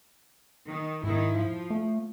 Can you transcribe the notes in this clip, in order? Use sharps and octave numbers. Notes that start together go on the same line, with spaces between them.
D#3
G#2 D#3 E4
F3
A3